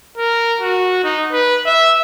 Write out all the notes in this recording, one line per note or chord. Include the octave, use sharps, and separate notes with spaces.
A#4
F#4
D#4
B4
E5